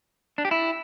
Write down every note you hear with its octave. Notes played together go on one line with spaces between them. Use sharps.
D4
G4
E4